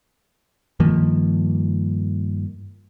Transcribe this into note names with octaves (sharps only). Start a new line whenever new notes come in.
G2 D#3 F3 A#3